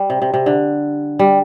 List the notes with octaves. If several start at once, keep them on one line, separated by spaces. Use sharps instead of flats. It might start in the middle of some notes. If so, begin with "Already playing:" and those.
Already playing: G3
C3
C3
C3
D3
G3